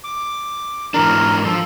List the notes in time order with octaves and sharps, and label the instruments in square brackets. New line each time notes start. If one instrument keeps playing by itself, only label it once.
[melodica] D6
[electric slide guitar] G#2 E3 D4 [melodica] A#4
[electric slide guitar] F3 [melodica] A4